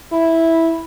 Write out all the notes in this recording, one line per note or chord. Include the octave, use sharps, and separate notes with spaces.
E4